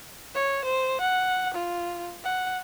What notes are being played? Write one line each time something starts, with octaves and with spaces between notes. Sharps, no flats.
C#5
C5
F#5
F4
F#5